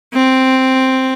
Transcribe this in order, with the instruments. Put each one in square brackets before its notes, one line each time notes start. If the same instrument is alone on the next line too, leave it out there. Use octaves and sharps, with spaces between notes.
[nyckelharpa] C4